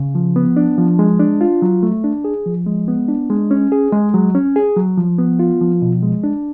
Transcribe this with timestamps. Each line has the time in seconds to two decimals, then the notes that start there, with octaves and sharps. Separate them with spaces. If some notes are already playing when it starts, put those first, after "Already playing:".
Already playing: C#3
0.15 F3
0.36 B3
0.57 D4
0.78 F3
0.99 G#3
1.20 D4
1.41 F4
1.62 F#3
1.83 A3
2.04 D4
2.24 G#4
2.46 F3
2.66 G#3
2.88 B3
3.08 D4
3.30 G#3
3.51 C#4
3.72 G#4
3.93 G#3
4.14 F#3
4.35 C#4
4.56 G#4
4.77 F#3
4.97 F3
5.18 B3
5.39 F4
5.61 F3
5.82 B2
6.03 G#3
6.24 D4